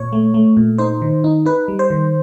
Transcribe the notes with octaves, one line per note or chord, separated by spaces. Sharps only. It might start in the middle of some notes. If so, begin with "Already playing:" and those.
Already playing: A#2 C#5
A3
A3
A#2
D#4 C5
D#3
D#4
D#4 B4
G3
C5
D#3